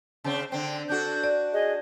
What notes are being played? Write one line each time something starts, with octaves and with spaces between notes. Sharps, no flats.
C#3 C4
D3 C4 G5
D4 F#4 A4 G6
D5
G#4 D#5